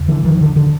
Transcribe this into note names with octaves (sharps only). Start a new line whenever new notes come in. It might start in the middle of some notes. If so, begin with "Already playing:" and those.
Already playing: E2 C#3
D3 E3
D#3 F3
D3
D3